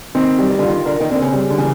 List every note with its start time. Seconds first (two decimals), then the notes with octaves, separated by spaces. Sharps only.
0.15 D#3 C4
0.39 G3
0.50 D#3
0.59 D3
0.63 F4
0.68 D#3
0.86 D3 A#4
1.01 D#3
1.11 D3 C4
1.22 C#3
1.33 G3
1.50 D3
1.58 C#3 E3